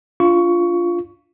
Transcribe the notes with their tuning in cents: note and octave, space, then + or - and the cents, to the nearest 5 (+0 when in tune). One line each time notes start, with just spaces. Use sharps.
D4 -15 F4 -5 C#6 +15